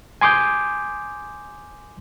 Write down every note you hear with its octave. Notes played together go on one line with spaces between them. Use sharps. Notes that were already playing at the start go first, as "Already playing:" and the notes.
G#5 C6 D6 D#6 G6